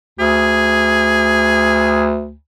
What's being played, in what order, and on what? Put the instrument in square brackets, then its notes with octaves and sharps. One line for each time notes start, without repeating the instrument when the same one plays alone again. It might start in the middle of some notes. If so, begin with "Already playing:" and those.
[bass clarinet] D2 [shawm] G#4